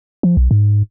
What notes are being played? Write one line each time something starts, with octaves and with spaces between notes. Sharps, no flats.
F3
B1
G#2